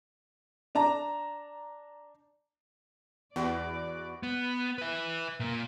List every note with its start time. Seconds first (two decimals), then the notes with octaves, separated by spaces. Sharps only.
0.75 D4 A5 A#5
3.36 E2 F#4 B4 D5
4.23 B3
4.78 B4 E5
5.40 A#2 A#3